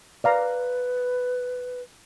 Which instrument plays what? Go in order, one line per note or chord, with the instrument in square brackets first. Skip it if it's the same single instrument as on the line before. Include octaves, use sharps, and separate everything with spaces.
[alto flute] B4 [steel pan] D5 F5 A#5